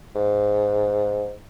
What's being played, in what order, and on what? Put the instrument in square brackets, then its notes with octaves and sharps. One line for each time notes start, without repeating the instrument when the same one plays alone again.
[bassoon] G#2